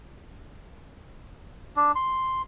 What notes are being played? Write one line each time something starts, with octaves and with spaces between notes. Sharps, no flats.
D4
C6